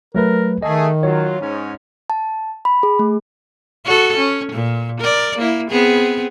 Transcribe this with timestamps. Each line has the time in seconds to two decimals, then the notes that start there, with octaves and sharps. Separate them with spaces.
0.15 F#3 A3 A#4 B4
0.63 D#3 A3 G#4 D#5
1.03 F#3 F4 C#5
1.40 G#2 C#4
2.10 A5
2.65 B5
2.83 G#4
2.99 A3
3.85 F#4 A4
4.17 C#4
4.52 A#2
5.00 A#4 D5
5.38 A#3 E4
5.70 B3 C4 G#4